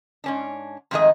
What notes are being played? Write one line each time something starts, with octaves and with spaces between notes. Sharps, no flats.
G#2 C#4 D4
F2 G#2 D#3 G#3 A3 D#5